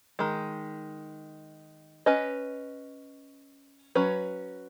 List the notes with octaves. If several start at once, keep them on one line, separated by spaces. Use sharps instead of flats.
D#3 G#3
C#4 B4 D#5
F#3 C#4 B4